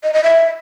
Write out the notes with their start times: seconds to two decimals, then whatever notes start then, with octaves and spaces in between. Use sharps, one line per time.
0.03 D#5
0.13 D#5
0.23 E5